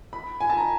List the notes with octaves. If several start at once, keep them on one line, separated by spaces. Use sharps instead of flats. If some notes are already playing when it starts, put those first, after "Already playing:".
B5
G#5
A5
A#5